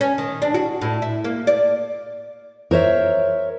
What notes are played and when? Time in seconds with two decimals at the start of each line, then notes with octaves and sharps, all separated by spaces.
0.01 C#4
0.18 D#3
0.42 D4
0.54 F#4
0.82 A2
1.02 E4
1.24 A#3
1.47 D5
2.71 A#4 C5 C#5 E5